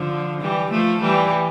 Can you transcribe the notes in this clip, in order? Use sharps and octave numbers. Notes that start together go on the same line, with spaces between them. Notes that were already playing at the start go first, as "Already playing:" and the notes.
Already playing: D3 F3
E3 G3
F3 A3
E3 G3